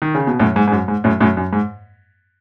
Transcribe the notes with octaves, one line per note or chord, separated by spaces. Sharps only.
D#3
C#3
B2
F#2 A2
G#2
G#2
F#2
G#2
F#2 A2
F#2 A2
F#2
G#2